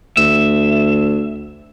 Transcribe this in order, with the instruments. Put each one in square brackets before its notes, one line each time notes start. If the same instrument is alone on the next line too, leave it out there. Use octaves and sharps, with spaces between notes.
[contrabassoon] D2 [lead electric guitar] E5